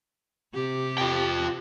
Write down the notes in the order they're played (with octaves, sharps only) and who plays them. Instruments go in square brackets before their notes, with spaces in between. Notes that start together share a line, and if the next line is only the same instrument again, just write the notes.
[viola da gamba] C3 G4
[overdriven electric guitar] F4 G5